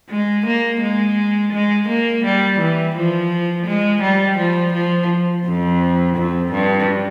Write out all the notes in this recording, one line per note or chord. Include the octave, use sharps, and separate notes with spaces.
G#3
A#3
G#3
G#3
A#3
G3
E3
F3
G#3
G3
F3
F3
F2
F2
G2